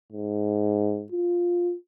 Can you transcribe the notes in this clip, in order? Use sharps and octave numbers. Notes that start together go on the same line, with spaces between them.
G#2
F4